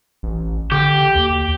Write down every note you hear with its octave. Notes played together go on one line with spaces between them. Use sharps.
A1
D3 G4
D#2